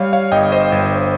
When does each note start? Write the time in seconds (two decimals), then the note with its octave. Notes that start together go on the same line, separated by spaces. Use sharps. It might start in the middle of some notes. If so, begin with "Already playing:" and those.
Already playing: G3 C#5 F5
0.13 C#5 F5
0.32 G1 D#5 G5
0.52 C5 D#5
0.72 G1